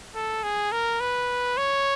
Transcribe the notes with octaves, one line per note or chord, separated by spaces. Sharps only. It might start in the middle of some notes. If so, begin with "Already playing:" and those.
A4
G#4
A#4
B4
C#5